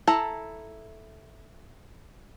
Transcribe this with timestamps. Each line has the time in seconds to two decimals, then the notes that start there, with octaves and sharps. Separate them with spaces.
0.07 E4 A4 A5 A#5